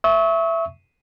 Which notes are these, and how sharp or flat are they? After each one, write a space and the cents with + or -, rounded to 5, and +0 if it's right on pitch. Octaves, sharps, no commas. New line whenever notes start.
E5 +10 C#6 +0 E6 -45